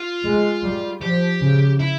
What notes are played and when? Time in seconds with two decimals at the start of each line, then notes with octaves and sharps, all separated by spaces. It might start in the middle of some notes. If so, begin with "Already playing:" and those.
Already playing: F4
0.23 G#3
0.63 G3
1.01 F3 G4
1.41 C#3
1.79 E4